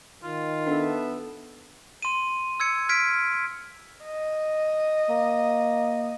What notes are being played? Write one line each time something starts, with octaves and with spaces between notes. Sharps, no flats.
D#3 F4
B3 D4 A4 E5
C6 D#7
E6 G#6 C#7
F6 G#6 B6 D7
D#5
A#3